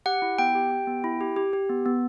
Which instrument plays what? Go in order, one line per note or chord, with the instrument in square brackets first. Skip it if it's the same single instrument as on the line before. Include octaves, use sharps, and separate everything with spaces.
[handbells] G4 F#5
E4
B3 G5
G4
G4
B3
E4
G4
G4
G4
B3
B3